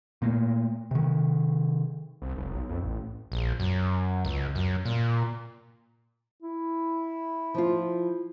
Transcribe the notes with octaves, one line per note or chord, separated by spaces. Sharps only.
A#2 A3 A#3
C3 D#3
C2
F1
B1
F2
A1
A#1
F#2
C#2
F#2
A#2
E4
F3 F4